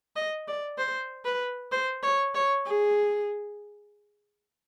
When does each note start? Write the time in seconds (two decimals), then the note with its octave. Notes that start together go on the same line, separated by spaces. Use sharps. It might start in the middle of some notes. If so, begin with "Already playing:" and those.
0.16 D#5
0.48 D5
0.78 C5
1.25 B4
1.72 C5
2.03 C#5
2.35 C#5
2.66 G#4